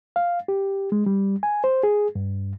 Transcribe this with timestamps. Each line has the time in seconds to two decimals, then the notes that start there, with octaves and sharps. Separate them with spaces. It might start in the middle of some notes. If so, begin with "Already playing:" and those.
0.16 F5
0.48 G4
0.92 G#3
1.06 G3
1.43 G#5
1.64 C5
1.83 G#4
2.15 G2